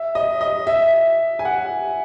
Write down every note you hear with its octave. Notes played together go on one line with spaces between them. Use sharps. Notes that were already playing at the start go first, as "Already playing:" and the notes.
Already playing: E5
D#5
D#5
E5
G#5
F#5